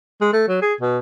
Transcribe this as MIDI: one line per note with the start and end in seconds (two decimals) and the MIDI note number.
0.21 0.32 56
0.33 0.44 57
0.48 0.58 54
0.62 0.74 68
0.81 0.99 47